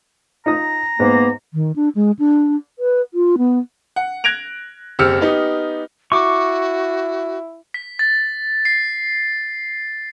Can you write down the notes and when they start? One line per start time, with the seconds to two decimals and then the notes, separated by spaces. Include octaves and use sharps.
0.46 D#4 F4 A#5 D#6
1.00 G#2 A#3 B3
1.54 D#3
1.76 D4
1.95 G#3
2.19 D4
2.79 B4
3.14 F4
3.38 B3
3.96 F#5
4.24 F#6 G#6 A#6 D7 F7
4.99 F#1 C4 G4 E6 F6 C#7
5.21 B3 D#4 G4
6.12 E4 F#4 C#6 D6
7.74 B6
7.99 A6
8.65 C7